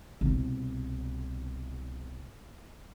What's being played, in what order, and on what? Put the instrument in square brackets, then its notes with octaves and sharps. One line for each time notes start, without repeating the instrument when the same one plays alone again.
[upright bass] C2 B2